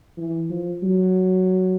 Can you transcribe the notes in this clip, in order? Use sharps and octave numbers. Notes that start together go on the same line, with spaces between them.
E3
F3
F#3